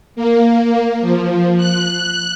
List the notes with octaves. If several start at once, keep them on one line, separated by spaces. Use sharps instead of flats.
A#3
F3
F#6